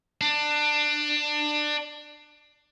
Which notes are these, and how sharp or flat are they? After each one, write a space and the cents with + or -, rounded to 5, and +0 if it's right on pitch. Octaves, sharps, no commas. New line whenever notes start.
D4 +20